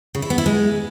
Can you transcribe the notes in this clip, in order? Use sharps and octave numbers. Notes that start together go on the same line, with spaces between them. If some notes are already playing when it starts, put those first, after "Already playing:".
C#3
E4
B3
E4
G#3